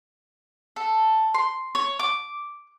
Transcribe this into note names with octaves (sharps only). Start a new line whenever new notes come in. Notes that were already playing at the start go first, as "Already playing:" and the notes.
A4
C6
C#5
D6